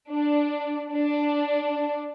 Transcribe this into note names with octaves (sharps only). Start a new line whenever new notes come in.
D4
D4